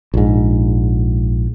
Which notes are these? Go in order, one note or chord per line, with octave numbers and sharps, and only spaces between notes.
A#1 G#2